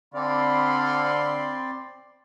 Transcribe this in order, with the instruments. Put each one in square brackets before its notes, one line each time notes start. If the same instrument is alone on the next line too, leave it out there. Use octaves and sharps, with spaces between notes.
[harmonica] D3 F5 [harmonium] C4 D5 [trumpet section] B5 C6